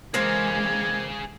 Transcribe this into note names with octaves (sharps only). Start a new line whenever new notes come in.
E3 G#3 A#3 C4 G#4 F5 G#6